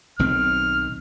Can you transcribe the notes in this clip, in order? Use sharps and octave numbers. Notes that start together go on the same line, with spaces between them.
B1 D#3 C4 F6